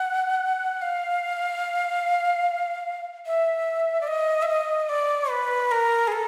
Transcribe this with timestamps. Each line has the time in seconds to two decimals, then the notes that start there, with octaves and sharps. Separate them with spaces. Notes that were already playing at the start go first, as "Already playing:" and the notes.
Already playing: F#5
0.82 F5
3.26 E5
4.01 D5
4.07 D#5
4.42 E5
4.48 D#5
4.89 D5
5.30 B4
5.71 A#4
6.07 G#4
6.12 A4